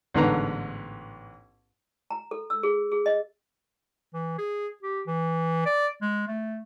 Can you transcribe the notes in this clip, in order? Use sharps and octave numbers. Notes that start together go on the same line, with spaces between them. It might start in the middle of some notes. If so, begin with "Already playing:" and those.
A1 G#2 D3 B3 B4 A#5
A#5
A4
E6
G#4
G#4
D#5
E3
G#4
G4
E3
D5
G#3
A3